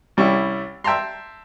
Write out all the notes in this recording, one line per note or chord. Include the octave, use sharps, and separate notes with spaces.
C2 G3 C#4 E4 C#6
E5 G5 A5 A#5 C6